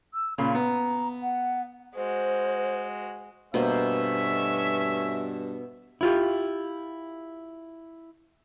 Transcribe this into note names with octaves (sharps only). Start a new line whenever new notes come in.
E6
A#2 C#3 B5
B3 A#5
F#5
G#3 F#4 C5
G2 B2 A3 A#3 C#4 C5 E5
E4 F4 G4